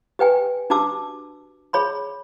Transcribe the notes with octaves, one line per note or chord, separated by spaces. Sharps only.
G4 B4 G5 G#5
D4 F#4 G4 A5 D6 E6
G#4 C#5 B5 C6